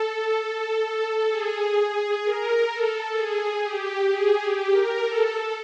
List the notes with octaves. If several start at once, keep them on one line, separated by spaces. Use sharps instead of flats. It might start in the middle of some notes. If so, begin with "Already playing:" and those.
Already playing: A4
G#4
A#4
A4
G#4
G4
G#4
G4
A#4
A4